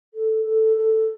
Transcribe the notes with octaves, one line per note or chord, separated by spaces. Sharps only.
A4
A4
A4